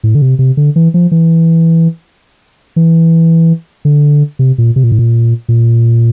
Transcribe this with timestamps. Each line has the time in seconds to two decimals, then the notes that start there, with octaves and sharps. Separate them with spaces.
0.03 A2
0.15 D3
0.22 C3
0.39 C3
0.57 D3
0.76 E3
0.94 F3
1.12 E3
2.76 E3
3.85 D3
4.39 C3
4.58 A#2
4.76 C3
4.84 A#2
4.92 A2
4.99 A#2
5.49 A#2